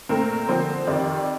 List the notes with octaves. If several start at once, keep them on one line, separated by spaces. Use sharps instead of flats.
A#2 A3 C4 A#4
D3 F3 C4 C5
F2 C3 D#3 D5